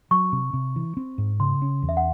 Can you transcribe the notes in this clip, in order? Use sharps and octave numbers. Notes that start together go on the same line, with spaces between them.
F#3 C#6
C3
C3
E3
C4
G#2
C#3 C6
C#4
E2
E5
F#5